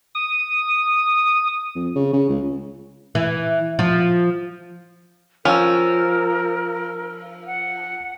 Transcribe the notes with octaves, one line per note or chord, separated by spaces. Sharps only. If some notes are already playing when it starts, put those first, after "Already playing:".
D#6
F2
C#3
C#3
C#2
E3
F3
F3 C#4 A#4 E6 F6
F#5